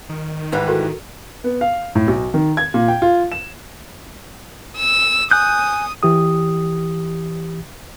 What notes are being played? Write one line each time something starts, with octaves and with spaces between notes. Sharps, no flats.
D#3
G#2 E3 G3 B4
F#4 A4 A#4
B3
F5
A2
B1
D#3
G#6
A#2
G5
F4
E7
E6
G#5 D#6 F#6 G6
E3 G4 D#6